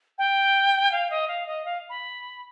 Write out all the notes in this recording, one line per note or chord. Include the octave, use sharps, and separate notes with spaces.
G5
F5
D#5
F5
D#5
F5
B5